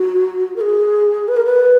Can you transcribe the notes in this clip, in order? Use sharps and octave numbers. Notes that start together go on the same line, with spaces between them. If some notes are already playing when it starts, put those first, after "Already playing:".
Already playing: F#4
A#4
G#4
B4
A#4
B4